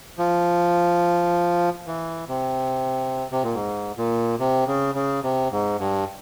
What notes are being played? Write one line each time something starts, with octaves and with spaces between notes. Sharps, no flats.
F3
E3
C3
C3
A#2
G#2
A#2
C3
C#3
C#3
C3
G#2
G2